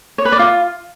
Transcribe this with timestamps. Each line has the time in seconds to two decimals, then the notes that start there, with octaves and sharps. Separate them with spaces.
0.18 C#5
0.25 B4
0.32 D5
0.39 F4